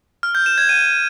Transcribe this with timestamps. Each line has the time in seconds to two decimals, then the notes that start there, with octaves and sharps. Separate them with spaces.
0.23 F6
0.35 G6
0.46 E7
0.58 G#6
0.69 D#7